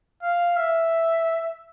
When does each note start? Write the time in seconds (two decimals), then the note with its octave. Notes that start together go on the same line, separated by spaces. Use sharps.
0.23 F5
0.57 E5